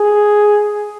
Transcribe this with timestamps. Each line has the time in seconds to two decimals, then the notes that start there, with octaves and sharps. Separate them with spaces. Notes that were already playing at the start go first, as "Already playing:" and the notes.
Already playing: G#4